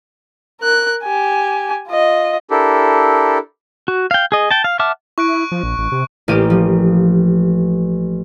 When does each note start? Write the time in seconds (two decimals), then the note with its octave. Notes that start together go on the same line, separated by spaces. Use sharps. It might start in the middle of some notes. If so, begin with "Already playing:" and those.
0.61 A#4 F#6
1.04 G4 G#5
1.88 F4 D#5
2.51 D4 E4 G4 A4 A#4
3.88 F#4
4.11 F5 G5
4.32 G#4 D#5
4.51 G5 A5
4.64 F5
4.79 E5 F#5 A5 D6 F6
5.18 E4 C#6 F#6 D7
5.52 F3
5.63 A#1
5.78 A1
5.92 C3
6.28 A1 A#3 F4 G4 D#7
6.50 F3